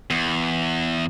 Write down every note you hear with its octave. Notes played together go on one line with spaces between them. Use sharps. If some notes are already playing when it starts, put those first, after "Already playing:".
E2